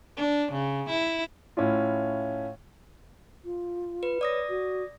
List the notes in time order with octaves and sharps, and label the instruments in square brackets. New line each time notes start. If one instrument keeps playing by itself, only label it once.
[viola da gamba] D4
C#3
E4
[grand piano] A2 C#4 E4 F4
[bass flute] F4
[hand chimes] B4
[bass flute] C#5 [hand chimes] D5 D#6 A#6
[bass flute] F#4